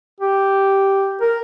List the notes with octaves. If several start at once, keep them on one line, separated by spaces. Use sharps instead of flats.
G4
A#4